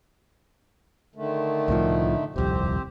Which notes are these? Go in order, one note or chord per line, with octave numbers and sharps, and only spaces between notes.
D3 D#3 A3
C2 A2 F3
D#1 C2 F2 C4 G4 C5